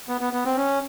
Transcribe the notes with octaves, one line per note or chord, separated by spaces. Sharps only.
B3
B3
B3
C4
C#4